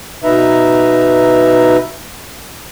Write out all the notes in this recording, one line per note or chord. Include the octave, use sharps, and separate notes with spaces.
B2 D#4 B4 E5 A#5